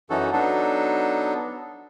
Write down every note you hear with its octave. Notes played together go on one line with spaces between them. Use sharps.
F#2 E3 C#4 D#4 F#4 A4
F#3 B3 D4 D#4 A4